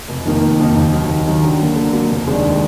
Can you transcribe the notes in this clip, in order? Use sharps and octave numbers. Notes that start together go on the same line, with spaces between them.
F1
F2 D#3 A#3 D#4
F1
F2 D#3 A#3 D#4
D#2
D#3 F#3
D#2
D#3 F#3
D3
F#3 A#3
D3
F#3 A#3
F1
D#2 D#3 G#3 D4